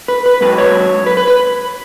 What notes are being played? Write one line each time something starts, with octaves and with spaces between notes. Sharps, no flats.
B4
B4
G#2 F#3 B4
C#5
B4
B4
B4